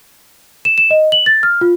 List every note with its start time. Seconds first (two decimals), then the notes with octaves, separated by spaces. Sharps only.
0.65 E7
0.78 E7
0.91 D#5
1.12 F#7
1.26 A6
1.43 F6
1.61 F4